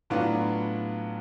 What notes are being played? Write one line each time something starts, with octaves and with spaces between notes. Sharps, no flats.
A2 F#3 B3 D4 F4